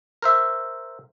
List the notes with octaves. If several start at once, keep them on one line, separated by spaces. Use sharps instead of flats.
A#4 C5 E5